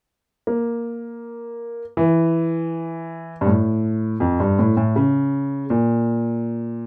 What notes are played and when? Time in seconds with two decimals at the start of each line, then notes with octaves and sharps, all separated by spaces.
0.47 A#3
1.97 E3
3.41 G2
3.46 A2
4.20 F2
4.40 G2
4.59 A2
4.77 A2
4.96 C#3
5.70 A#2